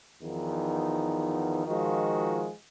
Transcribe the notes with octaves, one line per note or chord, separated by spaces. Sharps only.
E2 D#3 F3 B3 D#4
D#3 F3 G#3 F4 F#4